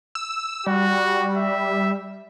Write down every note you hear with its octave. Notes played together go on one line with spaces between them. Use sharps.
E6
G3 F#4
E5